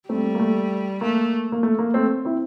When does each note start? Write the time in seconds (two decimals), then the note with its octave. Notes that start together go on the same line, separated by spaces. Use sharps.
0.09 G3 A3 C4
0.24 A3
0.35 A#3
0.39 A3
1.01 A3 A#3
1.52 A#3
1.63 A3
1.79 A#3
1.94 A3 C4
2.25 C4 E4